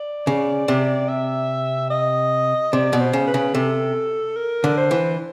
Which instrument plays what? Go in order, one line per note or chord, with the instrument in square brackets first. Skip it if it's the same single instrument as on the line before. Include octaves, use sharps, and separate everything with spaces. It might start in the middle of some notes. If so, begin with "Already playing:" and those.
Already playing: [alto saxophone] D5
[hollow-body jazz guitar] C#3
C3
[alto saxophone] E5
D#5
[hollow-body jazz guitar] C3 [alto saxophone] D5
[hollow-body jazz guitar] B2
[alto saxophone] C5
[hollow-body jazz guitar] C#3
[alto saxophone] B4
[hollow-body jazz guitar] C#3
[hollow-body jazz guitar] C3 [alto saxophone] A4
[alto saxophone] A#4
[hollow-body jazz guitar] D3
[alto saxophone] C5
[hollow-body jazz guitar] E3